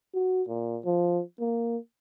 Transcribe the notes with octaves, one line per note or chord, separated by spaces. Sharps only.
F#4
A#2
F3
A#3